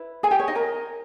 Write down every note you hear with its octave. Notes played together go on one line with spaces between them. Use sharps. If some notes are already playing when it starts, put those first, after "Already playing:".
Already playing: E4 B4
G#4 G#5
G4 G5
C#5
D#4 D#5
A#4 A#5